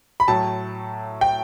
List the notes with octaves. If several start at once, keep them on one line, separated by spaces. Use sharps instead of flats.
B5
A2 F#3 A3 A5
G5